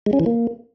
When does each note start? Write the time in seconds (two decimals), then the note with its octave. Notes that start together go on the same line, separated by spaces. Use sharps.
0.06 G#3
0.13 C#4
0.20 E3
0.26 A#3